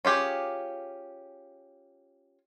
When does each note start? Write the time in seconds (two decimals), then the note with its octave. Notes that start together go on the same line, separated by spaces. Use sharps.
0.05 C#4 F4 G4 G#4